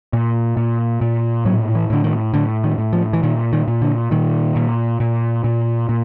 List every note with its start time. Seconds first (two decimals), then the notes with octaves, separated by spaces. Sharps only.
0.13 A#2
0.57 A#2
1.01 A#2
1.45 A2 F#3
1.75 E3
1.90 A2 D3
2.04 D#3
2.34 A2 D3
2.64 D#3
2.78 A2
2.93 F3
3.13 E3
3.23 A#2 D#3
3.53 D#3
3.68 A#2
3.82 D3
4.11 A#2 D#3
4.56 A#2
5.00 A#2
5.44 A#2
5.89 A#2